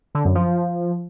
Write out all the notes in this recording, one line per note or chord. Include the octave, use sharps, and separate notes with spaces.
D3
F#2
F3